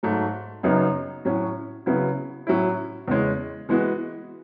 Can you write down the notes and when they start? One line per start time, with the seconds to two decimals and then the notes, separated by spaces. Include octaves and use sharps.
0.03 G#2 F#3 A3
0.63 F#2 C#3 F#3 B3 D#4
1.25 A2 F#3 C#4 F#4
1.86 C#3 F#3 B3 E4
2.47 A2 F#3 C#4 E4
3.08 E2 C#3 G#3 C#4
3.69 E3 G#3 B3 F#4